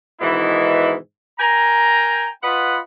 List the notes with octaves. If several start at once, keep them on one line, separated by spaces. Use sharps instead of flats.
G#2 B2 D#3 E3 E4
A#4 G5 G#5 A#5
F4 B4 D#5 F#5 B5